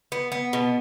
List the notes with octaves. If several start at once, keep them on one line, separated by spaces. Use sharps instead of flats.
B3
B3
B2